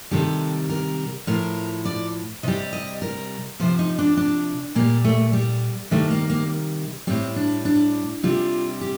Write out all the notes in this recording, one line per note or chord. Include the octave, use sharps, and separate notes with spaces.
C3 D#3 G3 A4
A#4
A2 F3 A#4
D5
C3 G3 D#5
D#5
A#4
C3 F3 C5
D#4
D4
D4
A#2 G3 A#3
A3
G3
C3 D#3 G3 A3
A#3
A#3
A2 G3 C4
D4
D4
C3 G3 F4
G4